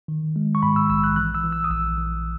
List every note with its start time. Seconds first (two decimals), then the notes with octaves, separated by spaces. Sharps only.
0.08 D#3
0.36 G#3
0.55 C#6
0.63 G#2 B5
0.76 E6
0.90 A#1 E6
1.04 F#6
1.16 E3 F#6
1.35 E6
1.44 E3
1.52 E6
1.64 D#6
1.70 A#1 E6
1.98 E3